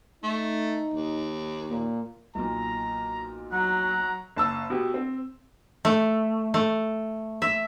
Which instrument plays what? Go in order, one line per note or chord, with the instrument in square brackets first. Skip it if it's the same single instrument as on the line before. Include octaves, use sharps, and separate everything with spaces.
[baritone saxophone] A3 [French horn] D#4
[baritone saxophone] D#2
[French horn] A#2
[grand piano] B1 A#2 [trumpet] A#5
[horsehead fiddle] F#3 [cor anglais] F#5 [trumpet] A#5
[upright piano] F#1 A5 E6
B2 G4
C4
[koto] A3
A3
E5